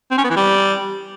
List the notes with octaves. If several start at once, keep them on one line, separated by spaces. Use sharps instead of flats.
C4
C#4
B3
E3
G3